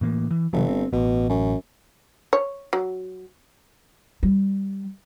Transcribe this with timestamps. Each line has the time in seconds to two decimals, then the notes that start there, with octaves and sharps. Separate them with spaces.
0.01 A2 E3 A#3
0.31 E3
0.53 G1 C3 E3 F#3
0.68 C4
0.93 A1 B2
1.29 F#2
2.33 C#5
2.73 F#3
4.23 G3